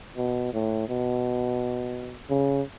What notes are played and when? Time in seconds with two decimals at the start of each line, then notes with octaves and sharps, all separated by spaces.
0.17 B2
0.53 A2
0.88 B2
2.30 C#3